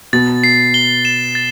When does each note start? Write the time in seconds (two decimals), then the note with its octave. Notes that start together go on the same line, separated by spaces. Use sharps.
0.13 B2 A6
0.44 C7
0.74 G7
1.05 E7
1.35 A6